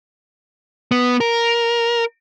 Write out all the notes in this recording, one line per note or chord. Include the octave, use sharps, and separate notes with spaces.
B3
A#4